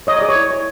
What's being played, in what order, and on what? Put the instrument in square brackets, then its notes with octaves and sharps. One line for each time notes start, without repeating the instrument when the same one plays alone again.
[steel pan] C#5 D#5
G#4 D5
C#5
E4
C#5